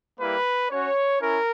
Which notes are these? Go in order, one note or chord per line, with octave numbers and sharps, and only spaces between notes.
G3 A#3 E4 B4
C#4 F#4 C#5
C#4 E4 A#4